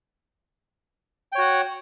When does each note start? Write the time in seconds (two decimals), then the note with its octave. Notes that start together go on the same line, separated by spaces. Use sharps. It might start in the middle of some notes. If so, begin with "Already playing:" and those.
1.32 G5
1.35 C#5
1.38 F#4
1.41 F#5